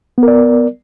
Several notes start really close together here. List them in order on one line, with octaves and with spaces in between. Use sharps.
B3 A#4 D5